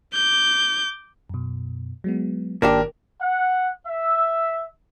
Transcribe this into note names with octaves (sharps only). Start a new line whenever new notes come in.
D6 G6
F#2 B2
F#3 G#3 B3
G1 A#2 D#3 D4 G4 A#4 A5
F#5
E5